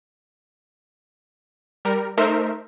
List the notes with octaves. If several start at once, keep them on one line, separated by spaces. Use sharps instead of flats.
G3 A#4
A3 D#4 A#4 C5 E5